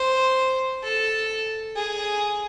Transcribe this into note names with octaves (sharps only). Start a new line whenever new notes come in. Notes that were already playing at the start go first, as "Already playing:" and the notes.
Already playing: C5
A4
G#4